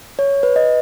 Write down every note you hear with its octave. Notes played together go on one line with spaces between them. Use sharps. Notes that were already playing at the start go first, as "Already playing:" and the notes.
C#5
B4
D#5